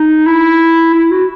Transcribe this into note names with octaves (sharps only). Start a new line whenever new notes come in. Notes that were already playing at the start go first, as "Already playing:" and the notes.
Already playing: D#4
E4
E4
F#4